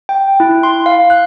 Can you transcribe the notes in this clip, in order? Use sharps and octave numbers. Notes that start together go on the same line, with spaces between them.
G5
E4
C6
F5
F#6